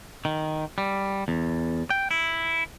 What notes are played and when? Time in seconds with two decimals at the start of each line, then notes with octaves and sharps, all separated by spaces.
0.25 D#3
0.78 G3
1.28 E2
1.90 G5
2.11 E4